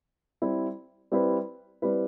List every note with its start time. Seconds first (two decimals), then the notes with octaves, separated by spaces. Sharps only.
0.42 G3 C4 E4
1.12 G3 C4 E4 B4
1.82 G3 C4 E4 B4